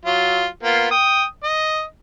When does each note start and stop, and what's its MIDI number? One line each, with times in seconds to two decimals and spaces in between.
0.05 0.47 54
0.05 0.47 65
0.63 0.88 58
0.63 0.88 59
0.63 0.88 65
0.91 1.23 79
0.91 1.23 87
1.43 1.84 75